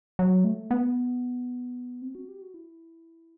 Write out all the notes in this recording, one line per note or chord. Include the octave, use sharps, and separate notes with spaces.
F#3
A3
B3
C4
F#4
G4
F#4
E4